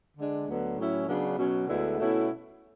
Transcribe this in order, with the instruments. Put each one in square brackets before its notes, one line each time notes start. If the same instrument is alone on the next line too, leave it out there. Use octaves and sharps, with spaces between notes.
[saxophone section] D3 G#3 D4
D2 D3 F#3 B3
A2 F#3 C#4 E4
C#3 F#3 B3 D4
B2 F#3 C#4
D2 D3 G#3 B3 E4
B2 A3 C#4 E4